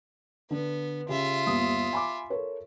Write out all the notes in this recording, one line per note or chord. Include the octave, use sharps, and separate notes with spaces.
D3 B3
C#3 F4 G4 E5
G1 D#2 D#6
G#5 B5 D6
A4 A#4 C#5